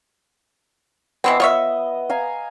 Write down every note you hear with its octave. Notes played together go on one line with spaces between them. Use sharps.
B2 E3 B3 C4
F4 C#5 D#5 E5
F5 G#5 A#5